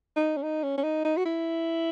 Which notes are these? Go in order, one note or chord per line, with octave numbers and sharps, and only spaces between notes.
D#4
C#4
D#4
C#4
C#4
D#4
D#4
F#4
E4